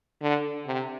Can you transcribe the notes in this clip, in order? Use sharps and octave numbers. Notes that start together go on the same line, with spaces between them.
D3
C3